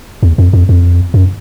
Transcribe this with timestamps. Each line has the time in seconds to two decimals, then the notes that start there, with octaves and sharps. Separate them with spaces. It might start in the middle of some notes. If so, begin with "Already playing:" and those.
0.23 E2
0.38 F2
0.53 F2
0.69 F2
1.14 F#2